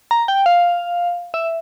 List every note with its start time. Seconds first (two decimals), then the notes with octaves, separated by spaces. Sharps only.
0.11 A#5
0.28 G5
0.46 F5
1.34 E5